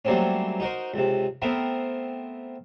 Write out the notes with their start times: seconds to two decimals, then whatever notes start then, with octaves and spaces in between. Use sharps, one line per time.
0.05 F#3 G3 A3 A#3 C4 C#4
0.60 D#4 F#4 A#4 C5
0.94 C#2 C3
1.42 A3 B3 C4 A#4 F5